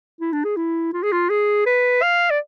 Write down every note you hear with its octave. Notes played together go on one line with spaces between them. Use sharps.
E4
D4
G#4
E4
F4
G#4
F4
G#4
B4
F5
D5